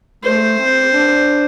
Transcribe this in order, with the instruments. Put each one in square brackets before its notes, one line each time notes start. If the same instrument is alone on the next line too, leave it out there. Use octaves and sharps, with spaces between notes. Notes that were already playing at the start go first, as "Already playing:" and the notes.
[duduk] A3 [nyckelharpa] C5
[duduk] C4
D4